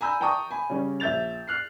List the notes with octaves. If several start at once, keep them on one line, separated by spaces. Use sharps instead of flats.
G#5 A#5 B5 E6 G6
D5 G5 A5 A#5 C#6 D#6
G#5 B5
C#3 G3 C#4
A#1 E5 G6 A6 F7
F6 F#6 C7